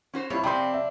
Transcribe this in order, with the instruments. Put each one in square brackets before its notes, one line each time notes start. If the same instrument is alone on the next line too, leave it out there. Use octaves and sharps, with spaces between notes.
[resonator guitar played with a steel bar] C#4 F#4 C5
[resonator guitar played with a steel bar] G2 [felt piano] C3 E4 [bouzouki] G3 C#5
[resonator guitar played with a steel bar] C3 C4 [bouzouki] F3 D4 [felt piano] G5 B5 C6
[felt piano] E5